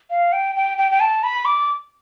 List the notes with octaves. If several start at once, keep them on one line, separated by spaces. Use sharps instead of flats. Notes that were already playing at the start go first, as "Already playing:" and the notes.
F5
G5
G5
G5
G5
A5
B5
D6